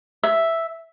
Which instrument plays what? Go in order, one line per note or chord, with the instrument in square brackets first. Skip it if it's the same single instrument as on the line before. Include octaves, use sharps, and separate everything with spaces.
[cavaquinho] E5